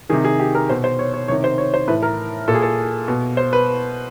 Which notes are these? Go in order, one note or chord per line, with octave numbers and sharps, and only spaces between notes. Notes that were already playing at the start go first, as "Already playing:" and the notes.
C3 D#3 G#4
G#4
G4
A#4
B2 C5
C5
C#5
C#5
C3 D#3 C#5
C5
C#5
C5
A2 E3 B4
A#4
A#2 A4
G#4
A4
B2
C5
B4